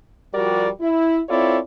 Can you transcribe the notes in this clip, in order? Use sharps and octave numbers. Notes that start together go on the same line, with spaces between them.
F3 G3 F#4 G4 A#4 D5
E4
C4 E4 F4 A4 C#5 D5